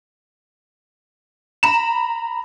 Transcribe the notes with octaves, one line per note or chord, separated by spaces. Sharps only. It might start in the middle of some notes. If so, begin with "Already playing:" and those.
A#5 B5 E7